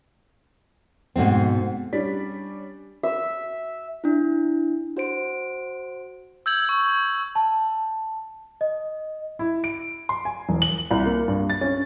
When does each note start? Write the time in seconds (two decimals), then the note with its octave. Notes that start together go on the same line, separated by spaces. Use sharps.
1.16 G#2 B2 A3 C4
1.93 G3 C#4 D4 D5 B6
3.03 E5
4.04 D4 E4
4.97 F#4 C5 D7
6.46 E6 G6 G#6 F#7
6.69 C#6
7.35 A5
8.61 D#5
9.39 E4
9.64 D7
10.09 C6
10.25 G#5
10.49 E1
10.62 F#7
10.91 C2
11.06 A#3
11.28 G2
11.50 A6
11.61 C#4